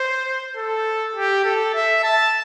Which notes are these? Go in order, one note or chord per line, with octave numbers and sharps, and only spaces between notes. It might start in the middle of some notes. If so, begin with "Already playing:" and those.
Already playing: C5
A4
G4
A4
E5
A5